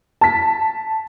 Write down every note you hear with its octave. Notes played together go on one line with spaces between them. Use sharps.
A5 B6